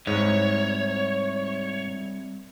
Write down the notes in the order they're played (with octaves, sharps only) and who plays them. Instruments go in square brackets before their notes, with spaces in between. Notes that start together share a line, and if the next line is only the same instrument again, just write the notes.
[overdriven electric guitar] C2 [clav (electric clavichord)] G#2 [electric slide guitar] C#5